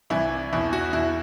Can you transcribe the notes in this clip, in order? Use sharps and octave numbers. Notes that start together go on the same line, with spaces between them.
C2 C3 E3 E4
E2 B2 E4
F#4
E2 B2 E4